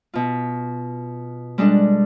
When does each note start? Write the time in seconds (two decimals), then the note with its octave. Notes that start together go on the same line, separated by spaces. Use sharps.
0.14 B2 F4
1.58 G3 G#3 D4 A4